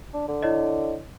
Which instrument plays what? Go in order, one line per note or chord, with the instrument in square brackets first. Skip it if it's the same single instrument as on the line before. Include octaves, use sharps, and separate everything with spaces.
[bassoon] D4
D3
[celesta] E4 C#5 D#5